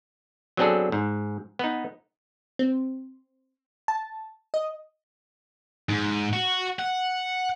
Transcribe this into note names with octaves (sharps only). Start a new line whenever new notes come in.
F#3 B3 C4 D4 G#4 A4
G#2
B3 D#4
C4
A5
D#5
G#2
F#4
F#5